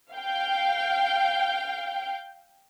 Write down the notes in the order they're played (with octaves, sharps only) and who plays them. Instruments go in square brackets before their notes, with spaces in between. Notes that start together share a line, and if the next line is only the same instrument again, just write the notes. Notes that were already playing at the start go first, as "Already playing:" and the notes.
[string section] F5 G5